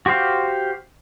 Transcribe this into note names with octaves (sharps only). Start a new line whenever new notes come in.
F#4 G4 C5 F5